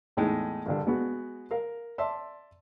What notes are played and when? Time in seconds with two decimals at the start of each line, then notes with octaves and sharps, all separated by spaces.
0.17 E2 A2 G#3 D#4
0.66 A#1 G2 D3
0.87 G#3 B3 F#4
1.51 A#4 F5
1.98 D5 E5 A5 C6